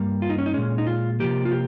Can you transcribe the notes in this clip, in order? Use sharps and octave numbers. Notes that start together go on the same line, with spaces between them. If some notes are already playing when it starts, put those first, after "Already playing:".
Already playing: G2 G3 A#3
F4
D#4
C#4
D#4
A#2 G#3 C#4
D#4
F4
C3 F3 A#3 G4
F4
G4